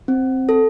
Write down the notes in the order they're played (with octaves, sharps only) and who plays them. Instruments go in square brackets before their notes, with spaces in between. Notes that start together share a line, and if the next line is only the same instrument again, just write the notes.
[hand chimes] C4
A4